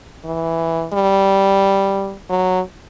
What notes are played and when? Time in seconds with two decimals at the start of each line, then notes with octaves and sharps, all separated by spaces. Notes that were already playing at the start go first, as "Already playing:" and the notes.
0.25 E3
0.93 G3
2.30 F#3